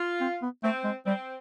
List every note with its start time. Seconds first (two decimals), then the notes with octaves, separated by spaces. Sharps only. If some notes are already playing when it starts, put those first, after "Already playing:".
Already playing: F4
0.21 C4
0.42 B3
0.64 A3 C4
0.84 G#3
1.06 G3 C4